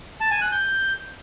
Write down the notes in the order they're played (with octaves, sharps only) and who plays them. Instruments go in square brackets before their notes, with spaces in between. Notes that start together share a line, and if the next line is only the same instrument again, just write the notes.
[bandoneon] A5
G#5
F#6
G6